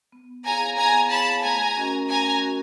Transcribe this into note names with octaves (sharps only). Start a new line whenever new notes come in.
B3
E4 G#4 C#5 F5 G#5 A#5
B3 G#5 A#5
E4 G#4 C#5 F5 A5 B5
A3 G#5 A#5
C#4 F#4 A#4 D#5
A3 G#5 A#5
C#4 F#4 A#4 D#5